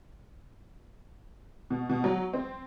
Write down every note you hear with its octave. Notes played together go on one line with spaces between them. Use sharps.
B2
B2
F#3
C4